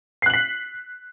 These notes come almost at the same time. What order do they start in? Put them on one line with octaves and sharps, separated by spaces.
C7 F#6 F#7 B6